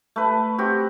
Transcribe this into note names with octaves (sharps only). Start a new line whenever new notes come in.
A3 B4
C4 F#4 G4